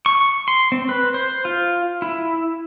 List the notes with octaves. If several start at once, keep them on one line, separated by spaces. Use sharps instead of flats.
C#6
C6
C4
B4
C5
F4
E4